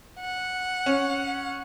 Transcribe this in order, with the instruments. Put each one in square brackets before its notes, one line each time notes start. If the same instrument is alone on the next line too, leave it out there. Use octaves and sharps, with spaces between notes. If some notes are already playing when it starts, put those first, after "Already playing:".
[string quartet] F#5
[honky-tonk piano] C#4